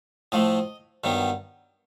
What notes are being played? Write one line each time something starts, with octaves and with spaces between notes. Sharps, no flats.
A2 F3 A3 D#5
G2 D#3 F#3 B3